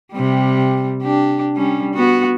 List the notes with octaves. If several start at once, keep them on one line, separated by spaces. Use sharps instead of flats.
C3 G3
D4 G4
G3 C#4
B3 F#4